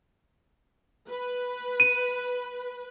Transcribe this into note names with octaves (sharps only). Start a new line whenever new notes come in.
B4
D#7